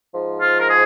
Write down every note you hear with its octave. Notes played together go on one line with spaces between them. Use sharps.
G#2 F3
F4
A#4
G#4